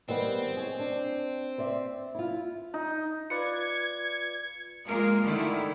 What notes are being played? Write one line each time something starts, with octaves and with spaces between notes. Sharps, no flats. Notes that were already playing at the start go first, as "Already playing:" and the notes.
D#3 G3 B3 C4
G#4 C#5
D4
C5 D5 E5
E4 F4
D#4
F4 B4 D5 G#6 C#7
G#3 A#3 F4 A#4
D3 D#3 A3 E4